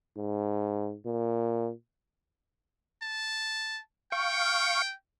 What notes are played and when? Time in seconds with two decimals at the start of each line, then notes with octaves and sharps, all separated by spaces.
0.17 G#2
1.06 A#2
3.02 A5
4.12 F5 G5 C#6